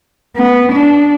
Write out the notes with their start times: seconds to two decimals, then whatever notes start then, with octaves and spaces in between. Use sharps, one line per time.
0.36 B3
0.72 D4